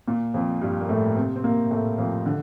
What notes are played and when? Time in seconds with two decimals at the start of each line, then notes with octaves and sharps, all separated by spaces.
0.08 A#2
0.34 F2 F3
0.61 G2 G3
0.81 A#3
0.89 A2 A3
1.16 C3 C4
1.36 C4
1.44 A#2 A#3
1.71 A2 A3
1.98 F2 F3
2.26 D3